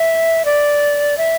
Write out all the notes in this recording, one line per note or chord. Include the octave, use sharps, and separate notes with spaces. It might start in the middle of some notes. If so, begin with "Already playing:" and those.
Already playing: E5
D5
E5